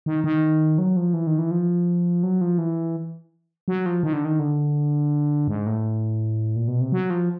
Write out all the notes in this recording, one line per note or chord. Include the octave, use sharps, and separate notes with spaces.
D#3
D#3
F#3
F3
E3
D#3
E3
F3
F#3
F3
E3
F#3
F3
D#3
D3
D#3
D3
G#2
A2
A#2
B2
C3
F#3
F3